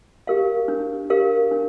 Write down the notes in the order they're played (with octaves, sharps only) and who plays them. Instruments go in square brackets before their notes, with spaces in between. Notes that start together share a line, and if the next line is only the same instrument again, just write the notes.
[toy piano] G4 A#4 F5
D4
G4 A#4 F5
D4